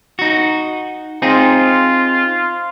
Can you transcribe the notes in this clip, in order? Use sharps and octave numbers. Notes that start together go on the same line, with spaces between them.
D#4 F#4
C4 D#4 F4 G#4